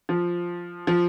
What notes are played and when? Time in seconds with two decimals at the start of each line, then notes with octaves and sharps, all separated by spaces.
0.09 F3
0.87 F3